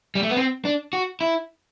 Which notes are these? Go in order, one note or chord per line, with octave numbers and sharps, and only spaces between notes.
G3
A3
B3
C4
D4
F#4
E4